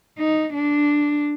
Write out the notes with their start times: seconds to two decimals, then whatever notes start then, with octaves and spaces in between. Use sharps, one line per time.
0.19 D#4
0.54 D4